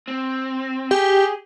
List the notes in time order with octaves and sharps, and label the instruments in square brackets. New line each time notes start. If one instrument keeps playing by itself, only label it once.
[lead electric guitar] C4
[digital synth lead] G4 [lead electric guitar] G#4